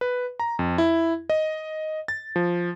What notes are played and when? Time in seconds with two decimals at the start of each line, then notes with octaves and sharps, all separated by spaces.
0.01 B4
0.40 A#5
0.59 F2
0.78 E4
1.30 D#5
2.08 A6
2.36 F3